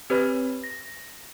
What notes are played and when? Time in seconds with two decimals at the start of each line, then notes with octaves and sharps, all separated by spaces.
0.10 C4 G4 B4 C#5 B5 F6
0.64 A#6